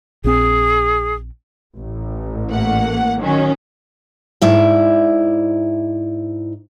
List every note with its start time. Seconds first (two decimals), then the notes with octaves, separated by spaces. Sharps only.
0.24 A#1 C4 G#4
1.76 A1
2.50 A3 A#3 F#5
3.21 D#3 F#3 C#4
4.42 G#2 E4 D5